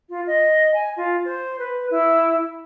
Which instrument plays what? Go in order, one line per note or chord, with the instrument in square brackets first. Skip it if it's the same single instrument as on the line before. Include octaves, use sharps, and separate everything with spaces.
[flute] F4
D#5
G#5
F4
C5
B4
E4